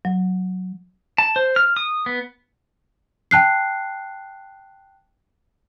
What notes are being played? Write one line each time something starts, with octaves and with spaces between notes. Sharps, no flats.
F#3
A5
C5
F6
D#6
B3
G5 A5 F#6 C7